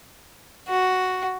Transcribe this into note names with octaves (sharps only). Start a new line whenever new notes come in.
F#4